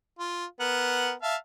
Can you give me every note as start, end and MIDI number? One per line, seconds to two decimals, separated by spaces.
0.19 0.45 65
0.60 1.12 59
0.60 1.12 70
0.60 1.12 78
1.22 1.35 76
1.22 1.35 77
1.22 1.35 81